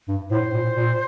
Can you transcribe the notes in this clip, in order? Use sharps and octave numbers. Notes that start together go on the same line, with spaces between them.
G2
A2 C5
A#2
A#2